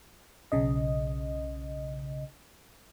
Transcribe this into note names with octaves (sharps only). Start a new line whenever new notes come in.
B1 C#3 D#5